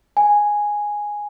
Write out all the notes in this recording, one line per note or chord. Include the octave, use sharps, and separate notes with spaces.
G#5